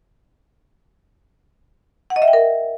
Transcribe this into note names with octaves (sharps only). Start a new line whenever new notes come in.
F#5
D#5
E5
G5
A#4